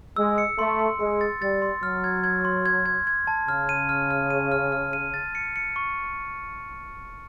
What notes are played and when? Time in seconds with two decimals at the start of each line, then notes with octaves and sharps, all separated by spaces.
0.16 G#3 E6
0.38 C#7
0.58 A3 C6
0.79 C6
1.00 G#3 C6
1.21 A6
1.41 G3 A6
1.62 C6
1.83 F#3 F6
2.04 G#6
2.24 G#6
2.45 C6
2.66 G#6
2.86 G#6
3.07 G#6
3.27 A5
3.48 C#3 F6
3.69 D#7
3.89 F6
4.10 F6
4.30 D#7
4.52 F6
4.72 F6
4.93 D#7
5.14 A6
5.35 C#7
5.56 C#7
5.76 C#6